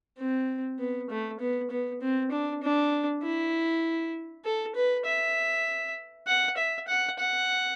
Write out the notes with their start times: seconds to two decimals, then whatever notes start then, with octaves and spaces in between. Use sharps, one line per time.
0.18 C4
0.79 B3
1.10 A3
1.40 B3
1.70 B3
2.01 C4
2.31 D4
2.63 D4
3.23 E4
4.45 A4
4.76 B4
5.05 E5
6.27 F#5
6.57 E5
6.88 F#5
7.19 F#5